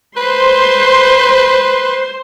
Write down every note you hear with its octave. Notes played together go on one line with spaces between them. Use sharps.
B4 C5 C6